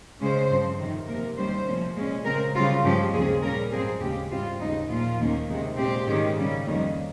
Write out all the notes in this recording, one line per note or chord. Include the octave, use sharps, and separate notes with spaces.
C#3 G#3 C#4 C5
G2 F3 C4
F2 C3 D#3
C3 F3 A#3 A#4
D#2 D#3 G3 C#4 C5
C3 F3 A#3 C#4
A#2 G#3 C#4
C#3 G#3 C4 A#4
C#3 G3 C4 F4
G2 F3 G#3 C#4 G4
D#2 C#3 F3 C4 G#4
A#2 G3 C#4 A#4
G#2 F3 C4 G#4
D#2 C#3 G#3 C#4 G4
G#2 G3 C4 F4
D#2 C#3 G#3 D#4
A#2 F3 A#3 F4
D#2 D#3 A#3 C#4
C3 D#3 G#3
A#2 G#3 C4 G4
G#2 D#3 G#3 C#4
C#3 G3 C#4
F2 D#3 G3 A#3 C#4